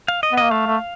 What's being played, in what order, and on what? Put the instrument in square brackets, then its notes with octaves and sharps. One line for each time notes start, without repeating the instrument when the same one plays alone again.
[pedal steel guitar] F5
D#5
[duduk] B3
[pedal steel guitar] D#5
[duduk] A#3
[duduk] A3 [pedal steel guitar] F5
[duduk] A3